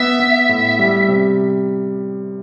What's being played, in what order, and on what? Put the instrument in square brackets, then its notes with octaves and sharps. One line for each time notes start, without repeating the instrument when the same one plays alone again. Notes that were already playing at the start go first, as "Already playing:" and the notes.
Already playing: [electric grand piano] B3 [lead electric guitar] E5
[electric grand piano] B3
A2
G3
C3